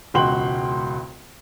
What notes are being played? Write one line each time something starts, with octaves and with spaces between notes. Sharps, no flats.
E1 C#2 F#4 G5 C6 F#7